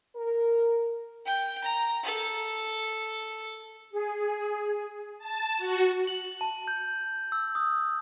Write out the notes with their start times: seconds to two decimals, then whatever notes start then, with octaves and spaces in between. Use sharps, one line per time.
0.16 A#4
1.26 G5
1.64 A#5
2.04 A4
3.92 G#4
5.18 A5
5.58 F#4
6.07 F#7
6.41 A5
6.68 G6
7.32 E6
7.55 D#6